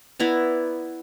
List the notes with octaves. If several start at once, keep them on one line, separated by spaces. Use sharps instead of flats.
B3 E4 D5 A#5